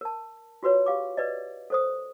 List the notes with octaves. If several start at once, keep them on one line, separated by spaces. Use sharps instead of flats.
A#4 A5
F4 F#4 B4 C#5
G4 F5 D6
B4 D5 D#5
A4 C5 D#6